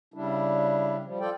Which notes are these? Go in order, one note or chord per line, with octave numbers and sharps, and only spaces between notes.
C#3 G3 D4 E4
F3 G3
F4 A4 D5 G5